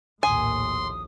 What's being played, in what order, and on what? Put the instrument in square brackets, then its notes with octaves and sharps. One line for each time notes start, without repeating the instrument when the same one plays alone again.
[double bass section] A#1 D#2 A2 [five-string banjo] G#5 [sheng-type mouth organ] C6 [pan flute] D#6